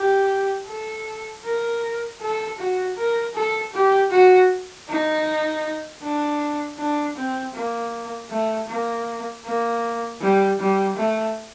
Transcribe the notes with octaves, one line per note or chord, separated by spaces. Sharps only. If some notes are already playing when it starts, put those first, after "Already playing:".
Already playing: G4
A4
A#4
A4
F#4
A#4
A4
G4
F#4
D#4
D4
D4
C4
A#3
A3
A#3
A#3
G3
G3
A3